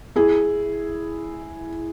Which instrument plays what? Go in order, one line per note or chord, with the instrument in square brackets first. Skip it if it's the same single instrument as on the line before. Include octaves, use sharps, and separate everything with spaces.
[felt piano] E4 G#4